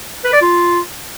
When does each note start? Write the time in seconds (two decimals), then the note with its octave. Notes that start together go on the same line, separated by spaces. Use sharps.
0.25 B4
0.33 D5
0.42 F4